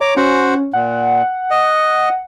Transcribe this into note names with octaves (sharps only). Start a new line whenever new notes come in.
C#5 A#5 D6
C#4 F#4 C5 F#5
A#2 F#5
D#5